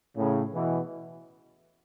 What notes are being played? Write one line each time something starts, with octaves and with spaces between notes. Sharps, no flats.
A2 C#3
B2 E3